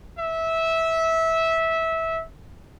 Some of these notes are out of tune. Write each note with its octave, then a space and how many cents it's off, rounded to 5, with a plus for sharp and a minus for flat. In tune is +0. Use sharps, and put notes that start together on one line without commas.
E5 -15